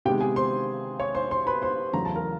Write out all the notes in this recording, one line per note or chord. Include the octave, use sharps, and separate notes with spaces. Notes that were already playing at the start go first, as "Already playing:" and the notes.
C3 D#3 G#3 B3 G4 G5
G#4 G#5
C5 C6
C#5 C#6
C5 C6
C5 C6
B4 B5
C5 C6
E2 C#3 F#3 A3 A#5
A5
A#4 A#5